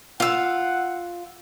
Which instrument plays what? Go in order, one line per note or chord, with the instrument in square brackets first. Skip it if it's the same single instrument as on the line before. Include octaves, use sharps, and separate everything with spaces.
[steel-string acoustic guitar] F4 [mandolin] F5 E6 [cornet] F#5